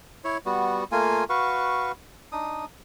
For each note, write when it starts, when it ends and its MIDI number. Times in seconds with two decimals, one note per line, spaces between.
0.24 0.38 64
0.24 0.38 73
0.46 0.84 55
0.46 0.84 59
0.46 0.84 66
0.92 1.24 57
0.92 1.24 58
0.92 1.24 65
0.92 1.24 80
1.30 1.92 66
1.30 1.92 71
1.30 1.92 77
1.30 1.92 85
2.32 2.65 62
2.32 2.65 63
2.32 2.65 87